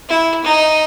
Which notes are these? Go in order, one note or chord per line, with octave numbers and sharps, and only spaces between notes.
E4
D#4